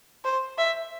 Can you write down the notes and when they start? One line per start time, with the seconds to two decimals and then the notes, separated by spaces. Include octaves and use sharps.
0.25 C5
0.58 E5